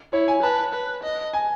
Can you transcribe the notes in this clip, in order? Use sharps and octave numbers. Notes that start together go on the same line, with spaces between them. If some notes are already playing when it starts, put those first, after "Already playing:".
E4 C#5
G#5
B4 A5
B4
D#5
G#5